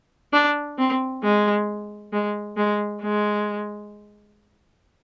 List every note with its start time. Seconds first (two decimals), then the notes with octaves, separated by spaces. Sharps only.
0.33 D4
0.78 C4
1.23 G#3
2.13 G#3
2.57 G#3
3.02 G#3